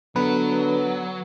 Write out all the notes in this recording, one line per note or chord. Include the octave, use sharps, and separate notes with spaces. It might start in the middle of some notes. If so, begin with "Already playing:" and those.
D3 F#3 B3 B4